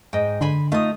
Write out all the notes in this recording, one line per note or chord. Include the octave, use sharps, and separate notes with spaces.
G#2 D#5 G5
D3 G#5 B5 C6
A3 D#4 F4 D#6